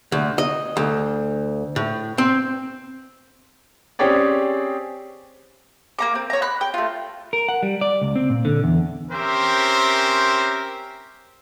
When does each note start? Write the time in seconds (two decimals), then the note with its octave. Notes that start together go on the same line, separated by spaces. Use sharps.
0.12 D2
0.38 D#5
0.77 D2
1.76 A2
2.18 C4
3.99 C4 C#4 G4 G#4 C#5 D5
5.99 A#3 A#5 D6
6.15 C4
6.30 C#5 A#5
6.42 B5 F#6
6.61 G5
6.74 A3 F4
7.33 A#4
7.48 F#5
7.63 G3
7.81 D5
8.02 C#2
8.16 C4
8.30 A#2
8.45 D3
8.64 E2
9.10 C4 C#4 G4 A#4 C5 E5